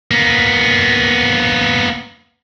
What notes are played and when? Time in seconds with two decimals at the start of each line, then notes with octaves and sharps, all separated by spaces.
0.11 A#3 B3